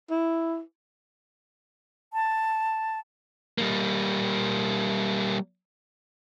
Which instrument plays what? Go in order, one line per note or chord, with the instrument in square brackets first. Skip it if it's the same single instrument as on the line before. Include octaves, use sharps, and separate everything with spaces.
[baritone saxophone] E4
[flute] A5
[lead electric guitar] G3 A#3